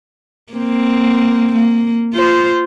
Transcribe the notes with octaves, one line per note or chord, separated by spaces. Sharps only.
A#3 C4
A#3
F4 C5